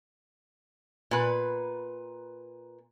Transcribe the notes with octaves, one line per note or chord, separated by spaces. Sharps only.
A#2 B4